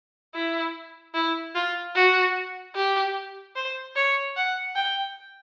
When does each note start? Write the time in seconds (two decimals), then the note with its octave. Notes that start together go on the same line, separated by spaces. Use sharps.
0.34 E4
1.14 E4
1.55 F4
1.95 F#4
2.76 G4
3.56 C5
3.96 C#5
4.36 F#5
4.76 G5